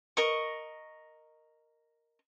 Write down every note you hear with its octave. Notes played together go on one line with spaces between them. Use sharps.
A#4 D#5 C#6